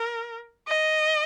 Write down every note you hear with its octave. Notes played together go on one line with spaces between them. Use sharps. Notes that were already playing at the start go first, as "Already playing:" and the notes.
Already playing: A#4
D#5